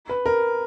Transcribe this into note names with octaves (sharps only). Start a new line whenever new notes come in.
B4
A#4